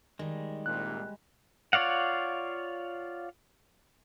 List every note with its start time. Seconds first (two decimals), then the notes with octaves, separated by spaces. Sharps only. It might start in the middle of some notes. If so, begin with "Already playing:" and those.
0.19 D#3 G3 G#3
0.66 C2 A#2 F#6
1.73 F4 C#5 D5 F5 F#5